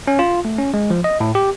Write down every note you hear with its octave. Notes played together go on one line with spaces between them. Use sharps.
C#4
F4
A3
C#4
G#3
F3
D#5
A2
G4